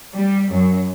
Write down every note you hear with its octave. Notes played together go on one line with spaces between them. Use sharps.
G3
F#2